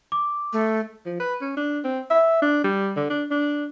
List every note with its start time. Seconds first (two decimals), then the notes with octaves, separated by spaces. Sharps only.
0.12 D6
0.53 A3
1.06 F3
1.20 B4
1.41 C#4
1.57 D4
1.84 C4
2.10 E5
2.42 D4
2.64 G3
2.97 D3
3.10 D4
3.31 D4